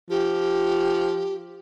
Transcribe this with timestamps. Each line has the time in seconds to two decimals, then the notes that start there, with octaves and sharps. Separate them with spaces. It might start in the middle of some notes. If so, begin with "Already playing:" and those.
0.10 F3 G4